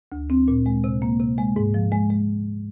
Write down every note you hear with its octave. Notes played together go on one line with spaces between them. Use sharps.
D2
C4
A#2
G#3
C3
A#3
C3
G#3
G#2
F3
G#3
G#3